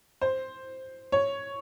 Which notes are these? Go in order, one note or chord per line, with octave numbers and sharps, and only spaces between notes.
C5
C#5